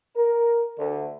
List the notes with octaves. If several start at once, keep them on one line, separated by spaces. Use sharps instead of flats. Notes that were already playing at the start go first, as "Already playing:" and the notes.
A#4
D2